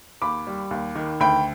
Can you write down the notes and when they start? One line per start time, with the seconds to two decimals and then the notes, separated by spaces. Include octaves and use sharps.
0.22 D#2 B5 D6
0.47 G3
0.71 D#2
0.95 D#3
1.20 D2 G5 B5